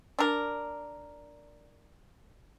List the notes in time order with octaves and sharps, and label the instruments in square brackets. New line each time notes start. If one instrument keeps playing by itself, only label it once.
[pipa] D4 A#4